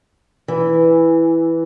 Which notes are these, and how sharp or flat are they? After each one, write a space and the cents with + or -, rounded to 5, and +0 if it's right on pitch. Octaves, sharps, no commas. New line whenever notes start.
E3 +0